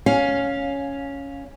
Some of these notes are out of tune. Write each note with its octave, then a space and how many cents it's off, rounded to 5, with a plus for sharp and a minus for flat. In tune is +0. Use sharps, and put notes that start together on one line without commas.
C#4 +5 F5 +15